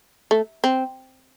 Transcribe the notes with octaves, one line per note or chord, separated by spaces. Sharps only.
A3
C4